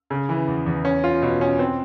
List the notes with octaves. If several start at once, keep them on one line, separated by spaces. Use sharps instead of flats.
C#3
E3
E2
E2
C#4
F4
B2
C#4
C4